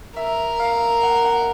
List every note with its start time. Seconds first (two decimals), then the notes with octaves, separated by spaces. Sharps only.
0.16 A#4 E5
0.60 F5
1.03 F#5
1.25 F#5